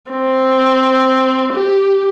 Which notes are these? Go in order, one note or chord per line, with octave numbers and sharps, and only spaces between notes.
C4
G4